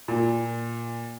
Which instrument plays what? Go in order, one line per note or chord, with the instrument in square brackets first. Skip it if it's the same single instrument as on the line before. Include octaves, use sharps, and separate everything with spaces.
[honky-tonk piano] A#2